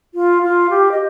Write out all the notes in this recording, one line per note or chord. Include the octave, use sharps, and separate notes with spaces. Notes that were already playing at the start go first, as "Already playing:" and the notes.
F4
F4
G4
D#5